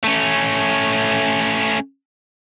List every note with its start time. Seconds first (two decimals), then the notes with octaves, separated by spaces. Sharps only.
0.04 A3 C#4